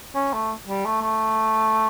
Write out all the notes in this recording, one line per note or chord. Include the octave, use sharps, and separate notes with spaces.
C#4
A3
G3
A3
A3